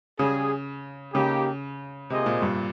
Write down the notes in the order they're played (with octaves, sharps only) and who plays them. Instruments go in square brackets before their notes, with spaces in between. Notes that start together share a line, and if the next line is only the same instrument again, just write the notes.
[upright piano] C#3 [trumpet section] G3 C#4 G#4
[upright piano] C#3 [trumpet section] A#3 D#4 G4
[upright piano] C3 [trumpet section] A#3 F4 G#4 C5 D#5
[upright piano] A#2
G2